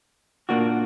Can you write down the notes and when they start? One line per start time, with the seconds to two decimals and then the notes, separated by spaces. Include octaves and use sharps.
0.49 A#2 A#3 D4 F#4